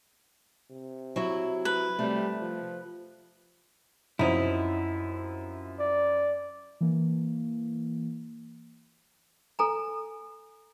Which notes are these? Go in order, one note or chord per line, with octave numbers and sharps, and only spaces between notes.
C3
F#3 E4
B4
C3 G3 A3
F3
F#2 F3 C4 D#4 E4
D5
E3 A#3
A4 G#5 A#5